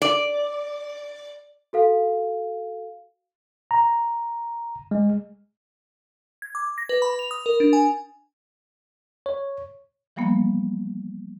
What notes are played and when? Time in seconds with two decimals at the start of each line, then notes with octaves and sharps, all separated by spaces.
0.02 D5
1.73 F#4 A4 F5
3.71 A#5
4.91 G#3
6.42 G#6
6.55 D6
6.78 A#6
6.89 B4
7.02 B5
7.19 F7
7.31 D#6
7.46 A#4
7.60 D4
7.73 G#5
9.26 C#5
10.16 E3 F3 G3 A#3 B3